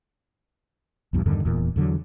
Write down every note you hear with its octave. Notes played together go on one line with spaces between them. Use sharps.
B1 E2 G2
E2 G2 D3 D#3
D#1 E2 A#2
E2 D3 F#3